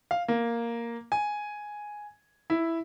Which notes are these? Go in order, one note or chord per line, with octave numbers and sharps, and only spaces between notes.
F5
A#3
G#5
E4